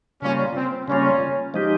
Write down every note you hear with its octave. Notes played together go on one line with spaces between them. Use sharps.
C#3 G3 A#3 C#4 F4
C4
C#3 G3 A#3 C#4 F4
F3 G#3 D#4 G4